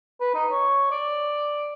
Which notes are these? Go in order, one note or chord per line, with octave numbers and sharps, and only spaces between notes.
B4
D#4
C#5
D5